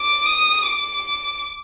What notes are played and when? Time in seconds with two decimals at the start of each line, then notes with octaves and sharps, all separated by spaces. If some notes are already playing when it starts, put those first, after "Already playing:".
Already playing: D6
0.26 D#6
0.63 D6